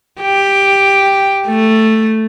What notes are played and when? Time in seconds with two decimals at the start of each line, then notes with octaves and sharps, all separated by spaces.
0.21 G4
1.47 A3